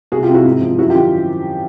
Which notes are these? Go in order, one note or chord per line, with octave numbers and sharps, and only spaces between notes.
C2 F#4 G#4
F4 G4
C3
E4 F#4
G#2
F3
F#2 E4 F#4
F4 G4
D#3